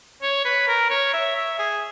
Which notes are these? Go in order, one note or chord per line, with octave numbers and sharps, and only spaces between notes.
C#5
B4
A#4
C#5
E5
E5
G#4